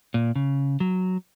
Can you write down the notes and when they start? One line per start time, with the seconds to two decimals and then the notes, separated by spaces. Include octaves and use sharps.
0.14 A#2
0.36 C#3
0.80 F#3